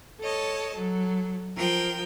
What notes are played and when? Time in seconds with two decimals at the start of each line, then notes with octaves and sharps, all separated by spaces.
0.21 A4 C#5 D#5 A5
0.75 F#3 A4
1.56 F3 A#4 G5